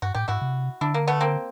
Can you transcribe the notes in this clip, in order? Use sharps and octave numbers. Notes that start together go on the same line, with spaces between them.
G2 F#4
A2 G4
G#2 E4 F#4
C3
D3 D4 E4
A#3
A3 B3
A#3 C4